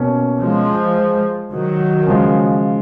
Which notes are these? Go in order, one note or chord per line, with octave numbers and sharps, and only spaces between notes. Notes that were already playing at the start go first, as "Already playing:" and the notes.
Already playing: B2 A#3 C#4
F3 G#3
D#3 F#3
C#3 F3 G#3